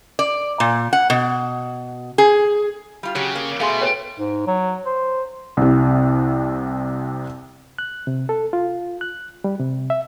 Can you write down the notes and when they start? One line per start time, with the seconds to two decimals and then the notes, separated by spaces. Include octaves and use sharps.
0.19 D5
0.60 A#2
0.93 F#5
1.10 B2
2.18 G#4
3.03 G3 F4
3.15 C#3 F#3 G4
3.35 A#3
3.60 B2 A3 G#4 F5 C6
3.81 B4 C#5 G5
4.19 G#2
4.47 F#3
4.86 C5
5.57 C2 C3
7.79 F#6
8.07 C3
8.29 A4
8.53 F4
9.01 F#6
9.44 G3
9.60 C3
9.90 E5